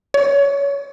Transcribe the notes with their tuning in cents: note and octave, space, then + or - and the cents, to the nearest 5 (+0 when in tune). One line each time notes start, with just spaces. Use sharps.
C#5 +20